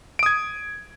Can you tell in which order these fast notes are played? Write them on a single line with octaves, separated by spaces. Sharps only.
D7 D#6 G#6